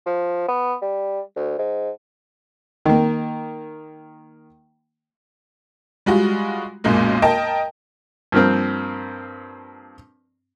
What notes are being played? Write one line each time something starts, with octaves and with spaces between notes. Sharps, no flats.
F3
B3
G3
D2
G#2
D#3 A#3
G3 G#3 F4 F#4
B1 F#2 A#2 G#3 A#3
A#4 D#5 G5 A5
G2 F3 A#3 C4